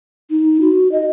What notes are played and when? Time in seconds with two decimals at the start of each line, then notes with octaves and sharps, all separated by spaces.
0.31 D#4
0.61 F#4
0.92 D#5